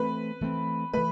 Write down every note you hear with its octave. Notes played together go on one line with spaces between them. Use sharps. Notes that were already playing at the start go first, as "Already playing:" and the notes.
Already playing: E3 A3 C4 B4
E3 A3 C4
E3 A3 B4